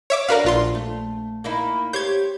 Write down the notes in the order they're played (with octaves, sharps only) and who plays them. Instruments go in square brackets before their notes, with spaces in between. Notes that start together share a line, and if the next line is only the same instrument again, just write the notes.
[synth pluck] C#5 E5 D6
[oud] D4 F#4 [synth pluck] A#4 B4 F5
[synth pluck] A#1 F4 C6
[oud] A3
A#3 D#4 E4
[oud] G4 C5 C#5 [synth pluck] G6 G#6